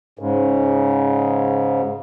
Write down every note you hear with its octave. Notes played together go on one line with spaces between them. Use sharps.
G#2 C#3